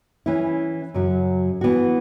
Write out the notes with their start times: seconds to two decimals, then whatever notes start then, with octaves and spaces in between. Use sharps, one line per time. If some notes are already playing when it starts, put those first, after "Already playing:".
0.26 E3 C#4 E4
0.94 F#2 C#3 F#3
1.61 E3 B3 F#4